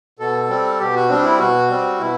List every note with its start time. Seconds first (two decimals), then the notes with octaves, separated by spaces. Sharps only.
0.19 B2 A4
0.49 G3 C4
0.79 B2 G4
0.95 F#4
1.09 G3 C4 D4
1.24 E4
1.39 B2 F#4
1.69 G3 C4
1.99 B2 E4